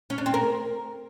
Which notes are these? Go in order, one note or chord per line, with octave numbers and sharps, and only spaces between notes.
C#4
D4
C4
A#4